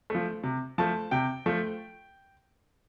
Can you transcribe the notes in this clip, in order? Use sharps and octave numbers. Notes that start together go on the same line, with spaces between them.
F3 A3
C3
F3 A3 A5
C3 G5
F3 A3